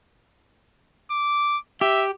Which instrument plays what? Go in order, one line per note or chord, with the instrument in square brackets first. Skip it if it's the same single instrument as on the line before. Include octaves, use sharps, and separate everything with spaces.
[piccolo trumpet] D6
[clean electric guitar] G4 [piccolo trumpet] E5